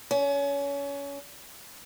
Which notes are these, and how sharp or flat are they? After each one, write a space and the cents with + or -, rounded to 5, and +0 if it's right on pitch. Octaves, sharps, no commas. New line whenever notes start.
C#4 +25